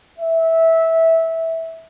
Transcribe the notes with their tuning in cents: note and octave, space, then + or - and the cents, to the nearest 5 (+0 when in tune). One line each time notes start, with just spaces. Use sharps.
E5 -15